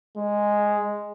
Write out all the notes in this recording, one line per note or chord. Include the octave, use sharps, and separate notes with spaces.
G#3